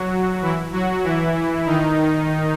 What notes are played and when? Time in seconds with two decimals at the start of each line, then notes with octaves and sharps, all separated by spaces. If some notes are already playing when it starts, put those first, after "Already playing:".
Already playing: F#3 F#4
0.41 E3 E4
0.72 F#3 F#4
1.04 E3 E4
1.66 D#3 D#4